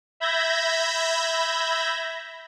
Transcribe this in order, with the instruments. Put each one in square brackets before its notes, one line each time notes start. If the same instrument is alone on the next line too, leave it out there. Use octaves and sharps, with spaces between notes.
[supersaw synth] E5 B5 G6 G#6 A#6